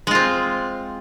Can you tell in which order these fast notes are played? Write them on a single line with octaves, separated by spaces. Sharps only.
G#3 F4 C4